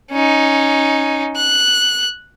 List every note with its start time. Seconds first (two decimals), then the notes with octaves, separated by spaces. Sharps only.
0.11 C#4 D#4
1.36 F#6